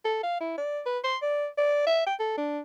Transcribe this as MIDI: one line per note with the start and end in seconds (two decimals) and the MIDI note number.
0.05 0.19 69
0.23 0.38 77
0.40 0.56 64
0.58 0.81 74
0.86 0.98 71
1.04 1.17 84
1.22 1.47 74
1.58 1.86 74
1.87 2.04 76
2.06 2.14 79
2.20 2.35 69
2.37 2.59 62